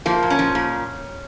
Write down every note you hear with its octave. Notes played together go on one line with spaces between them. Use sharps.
F3 A#3
A#2
C#4
F3
A#2